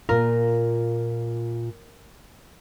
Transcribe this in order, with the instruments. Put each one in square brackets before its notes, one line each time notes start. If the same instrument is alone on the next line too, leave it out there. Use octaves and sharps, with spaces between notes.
[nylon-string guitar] A#2 F4 [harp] A#4